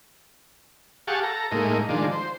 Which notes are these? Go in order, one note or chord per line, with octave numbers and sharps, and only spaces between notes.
G4 G#4 F5 F#5 A5 C#6
A4 A#5
A2 G#3 A#3 D#4
D#3 F3 G#3 D4
C5